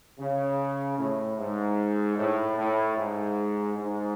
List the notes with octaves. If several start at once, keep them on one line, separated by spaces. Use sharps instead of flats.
C#3
A2
G#2
A2
A2
G#2
G#2